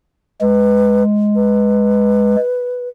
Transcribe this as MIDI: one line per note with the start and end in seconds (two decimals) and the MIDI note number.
0.41 2.36 56
0.41 1.03 71
1.36 2.89 71